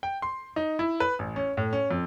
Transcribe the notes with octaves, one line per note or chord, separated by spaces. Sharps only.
G5
C6
D#4
E4
B4
A1
C#4
A2
C#4
F2